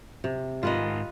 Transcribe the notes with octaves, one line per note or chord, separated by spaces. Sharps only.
C3
G#2 F4 A#4 B4 D#5